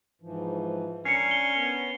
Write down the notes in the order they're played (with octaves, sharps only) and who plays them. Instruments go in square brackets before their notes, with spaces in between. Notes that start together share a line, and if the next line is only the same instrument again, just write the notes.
[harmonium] G#2 E3 F3
[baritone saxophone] C#4 [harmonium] D4 A#4 [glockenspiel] C7 C#7
[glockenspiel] G7
[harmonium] B3 C#5